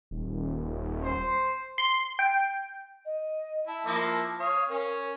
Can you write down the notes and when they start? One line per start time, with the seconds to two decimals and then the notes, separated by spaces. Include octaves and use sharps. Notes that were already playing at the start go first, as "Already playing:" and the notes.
0.11 D#1
1.03 C5
1.78 C6
2.19 G5
3.05 D#5
3.67 E4 A5
3.86 F3 A#3 E4
4.40 C#5 F5 D#6
4.69 C#4 A#4